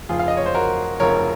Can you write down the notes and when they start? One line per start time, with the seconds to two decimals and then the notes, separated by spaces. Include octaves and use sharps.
0.09 F1 F2 C#3 F4 G#4
0.19 F5
0.28 D#5
0.37 C#5
0.46 C5
0.55 F#4 A#4
1.00 F1 F2 C#3 A#4 C#5